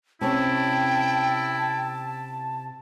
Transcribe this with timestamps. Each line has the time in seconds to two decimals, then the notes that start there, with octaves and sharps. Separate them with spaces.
0.21 C3 C#4 E4 G5 A5